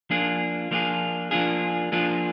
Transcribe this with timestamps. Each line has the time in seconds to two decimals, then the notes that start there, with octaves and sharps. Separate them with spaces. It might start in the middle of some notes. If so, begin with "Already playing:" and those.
0.10 F3 A#3 D4 F4 G#4
0.71 F3 A#3 D4 F4 G#4
1.31 F3 A#3 D4 F4 G#4
1.92 F3 A#3 D4 F4 G#4